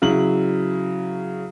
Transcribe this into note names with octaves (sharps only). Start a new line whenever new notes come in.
C#3 F#3 E4 F#7